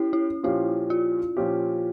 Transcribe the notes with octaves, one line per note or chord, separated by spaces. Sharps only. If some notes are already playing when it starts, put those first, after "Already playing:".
Already playing: C#4 E4 G4
E4
A#2 F3 C#4 E4 G4
F4
A#2 F3 C#4 G4